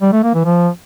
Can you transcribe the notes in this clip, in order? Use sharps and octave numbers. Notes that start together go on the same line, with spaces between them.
G3
A3
A#3
E3
F3